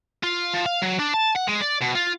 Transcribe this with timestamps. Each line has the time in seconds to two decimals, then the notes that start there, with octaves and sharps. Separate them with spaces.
0.23 F4
0.54 F3
0.66 F5
0.82 F#3
0.99 D4
1.14 A5
1.36 F#5
1.49 G#3
1.62 D5
1.82 B2
1.95 F4